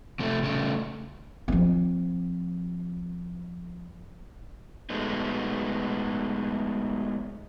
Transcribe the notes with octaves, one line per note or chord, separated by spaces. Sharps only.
C3 A3
C#3 A3
F3 C4
F#3 G#3 A3 B3 D#4